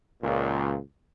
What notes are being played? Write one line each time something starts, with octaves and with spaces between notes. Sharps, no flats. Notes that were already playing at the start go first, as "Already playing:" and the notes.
C#2 A#2